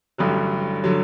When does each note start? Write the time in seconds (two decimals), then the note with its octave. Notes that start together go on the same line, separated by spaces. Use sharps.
0.18 A1 G2 D3 F#3
0.84 D3 F#3